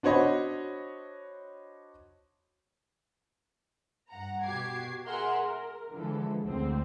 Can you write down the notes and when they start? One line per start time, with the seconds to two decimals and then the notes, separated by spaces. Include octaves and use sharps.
0.03 D4 F#4 C5 C#5 D#5 B5
4.10 G2 F#5 A#5
4.44 B2 F#4 G4 D6 G#6 C7
5.07 G#4 A#4 E5 F#5 A#5 C6
5.41 A#4
5.93 D3 E3 F3 G#3 A4
6.45 D2 D3 G#3 C4